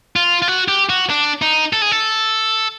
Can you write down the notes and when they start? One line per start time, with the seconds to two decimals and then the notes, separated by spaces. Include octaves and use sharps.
0.16 F4
0.42 F4
0.48 F#4
0.68 G4
0.89 F#4
1.10 D4
1.42 D#4
1.73 A4
1.82 G#4
1.91 A4